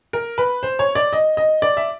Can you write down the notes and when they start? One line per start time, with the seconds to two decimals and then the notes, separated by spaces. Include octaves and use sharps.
0.13 A#4
0.38 B4
0.63 C5
0.79 C#5
0.95 D5
1.13 D#5
1.37 D#5
1.62 D5
1.77 E5